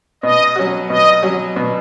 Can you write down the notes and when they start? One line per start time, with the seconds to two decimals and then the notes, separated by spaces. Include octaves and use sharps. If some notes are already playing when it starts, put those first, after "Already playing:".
0.23 B2 D#5
0.56 F#3 C#4 F#4
0.89 B2 D#5
1.23 F#3 C#4 F#4
1.56 B2